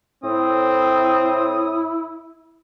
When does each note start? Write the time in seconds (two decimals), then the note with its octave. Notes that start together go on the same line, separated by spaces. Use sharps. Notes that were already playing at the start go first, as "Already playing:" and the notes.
0.24 A2 C4 E4 D#6